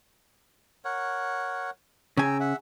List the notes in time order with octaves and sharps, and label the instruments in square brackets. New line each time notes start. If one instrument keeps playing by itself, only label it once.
[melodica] A#4 C#5 F#5
[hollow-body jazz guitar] C#3 G#5 [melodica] G5 A#5 E6
[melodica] E5 F#5